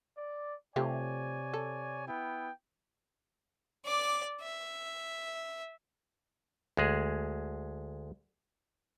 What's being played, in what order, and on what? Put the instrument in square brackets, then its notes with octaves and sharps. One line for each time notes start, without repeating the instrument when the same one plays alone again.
[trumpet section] D5
[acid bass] C3 [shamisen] F3 A3 G4 [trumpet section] C#5 D5 G#5
[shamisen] A4
[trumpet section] B3 E4 G5
[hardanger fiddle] D5 D6
E5
[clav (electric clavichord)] D2 G#3 G#4